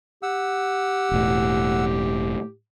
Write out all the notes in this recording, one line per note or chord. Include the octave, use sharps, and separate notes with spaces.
G4 F#5 E6
E1 A2